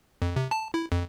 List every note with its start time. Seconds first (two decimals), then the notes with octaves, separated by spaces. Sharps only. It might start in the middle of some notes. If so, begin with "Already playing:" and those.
0.22 F2
0.36 C3
0.51 A5
0.74 E4
0.92 F2